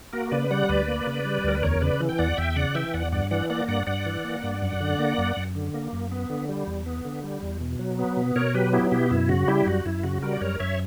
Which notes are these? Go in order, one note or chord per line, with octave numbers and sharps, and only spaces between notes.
A#3 F#4 A#4
C#3 B4 D5
G3 D5 F#5
D2 B4 D5
A#3
C#3
G3
D2 A#4
B4
E2 A#4 C#5
C#3 B4 D5
E3
G5
E2 D5 F#5
E2 E5 G5
C#3 D5 F#5
E3 E5 G5
E2 D5 F#5
G2 D5 F#5
E3 D5 F#5
A#3 D5 F#5
G2 D5 F#5
G2 D5 F#5
E3
A#3
G2
F#2
D3
A#3
F#2
F#2
D3
A#3
F#2
B3
D3
G3
E2
B3
D3
G3
E2
B2
F#3
B3
B2
B2 A#4 C#5
F#3 G4 B4
B3 E4 G4
B2 E4 G4
F#2 E4
C#3 F#4
G3 E4 G4
F#2 F#4
F#2 E4
C#3 F#4
G3 F#4 A#4
D5
F#2 A#4 C#5
F#2 C#5 E5